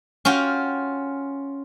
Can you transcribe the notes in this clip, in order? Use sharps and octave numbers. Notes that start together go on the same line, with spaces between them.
C#4 F4 F#4 G5